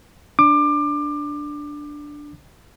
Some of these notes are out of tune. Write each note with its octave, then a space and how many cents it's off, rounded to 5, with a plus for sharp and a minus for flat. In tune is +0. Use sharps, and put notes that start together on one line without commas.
D4 +0 D6 +25